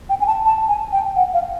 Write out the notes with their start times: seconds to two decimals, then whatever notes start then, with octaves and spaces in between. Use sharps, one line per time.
0.09 G5
0.20 G#5
0.27 A5
0.45 A5
0.68 G#5
0.93 G5
1.16 F#5
1.34 F5